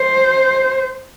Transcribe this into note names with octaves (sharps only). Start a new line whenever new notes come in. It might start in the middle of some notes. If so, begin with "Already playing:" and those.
Already playing: C5